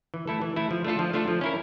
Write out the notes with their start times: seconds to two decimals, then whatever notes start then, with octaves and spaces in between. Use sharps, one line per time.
0.14 E3
0.27 A3 E4 A4
0.42 E3
0.56 A3 E4 A4
0.71 F3
0.85 A3 D4 F4 A4
0.99 F3
1.14 A3 D4 F4 A4
1.28 F3
1.41 C#4 E4 A#4